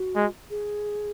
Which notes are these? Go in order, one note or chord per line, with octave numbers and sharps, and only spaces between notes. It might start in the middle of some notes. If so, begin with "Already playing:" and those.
Already playing: F#4
G#3
G#4